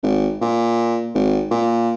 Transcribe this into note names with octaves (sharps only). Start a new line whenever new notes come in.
G#1
A#2
G#1
A#2